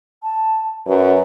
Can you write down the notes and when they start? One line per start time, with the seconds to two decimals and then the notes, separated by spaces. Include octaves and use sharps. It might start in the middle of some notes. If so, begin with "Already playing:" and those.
0.23 A5
0.87 F#2 B4